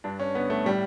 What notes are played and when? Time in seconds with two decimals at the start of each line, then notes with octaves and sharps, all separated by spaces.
0.04 G2 D4
0.20 C#4
0.35 D3 B3
0.50 A3
0.65 A2 G3